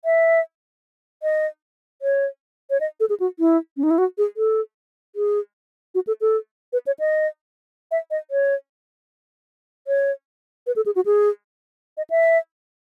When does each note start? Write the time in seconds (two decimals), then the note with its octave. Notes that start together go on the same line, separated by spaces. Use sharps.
0.05 E5
1.23 D#5
2.02 C#5
2.70 C#5
2.80 D#5
3.00 A4
3.09 G#4
3.20 F#4
3.39 E4
3.77 C#4
3.83 D#4
3.91 E4
3.98 F#4
4.18 G#4
4.37 A4
5.16 G#4
5.95 F#4
6.07 A4
6.21 A4
6.73 B4
6.87 C#5
6.99 D#5
7.91 E5
8.11 D#5
8.31 C#5
9.87 C#5
10.67 B4
10.76 A4
10.86 G#4
10.96 F#4
11.06 G#4
11.97 D#5
12.10 E5